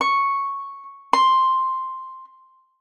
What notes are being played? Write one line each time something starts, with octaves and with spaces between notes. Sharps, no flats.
C#6
C6